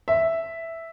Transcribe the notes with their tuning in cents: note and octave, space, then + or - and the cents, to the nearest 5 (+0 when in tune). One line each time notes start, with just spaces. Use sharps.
E5 +0